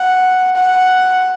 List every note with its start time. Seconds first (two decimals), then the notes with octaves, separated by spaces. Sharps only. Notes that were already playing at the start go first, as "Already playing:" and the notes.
Already playing: F#5
0.55 F#5